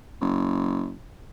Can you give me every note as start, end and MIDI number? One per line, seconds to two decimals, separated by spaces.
0.21 0.92 30